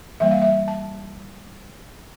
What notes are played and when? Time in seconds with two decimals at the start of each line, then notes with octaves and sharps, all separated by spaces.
0.20 E3 G3 A#3 E5
0.31 F5
0.42 E5
0.68 A5